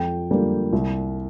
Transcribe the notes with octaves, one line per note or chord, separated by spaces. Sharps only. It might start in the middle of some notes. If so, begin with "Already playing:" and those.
Already playing: F2 G5
D3 G3 A#3
C2